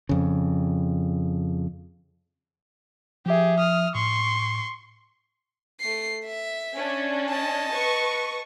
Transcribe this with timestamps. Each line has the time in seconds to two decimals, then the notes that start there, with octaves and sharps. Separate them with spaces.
0.09 F2 C#3
3.26 F3 G4 G#4 E5
3.59 D#6 F6
3.95 A2 C6 C#6
5.80 A3 C7
6.25 E5
6.75 C#4 D4
7.29 D#5 A5
7.70 B4 C#6